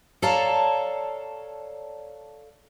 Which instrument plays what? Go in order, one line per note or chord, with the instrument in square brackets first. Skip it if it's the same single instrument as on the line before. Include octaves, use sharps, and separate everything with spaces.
[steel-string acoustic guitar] A4 C#5 D5 F5 A5 A#5